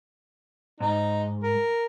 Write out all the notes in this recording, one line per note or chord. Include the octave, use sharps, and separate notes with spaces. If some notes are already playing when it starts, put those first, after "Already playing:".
G#2 D#4
A#4